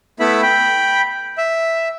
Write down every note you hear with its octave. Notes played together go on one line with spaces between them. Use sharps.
A3 B3 E4 E5 B5
G5 B5
E5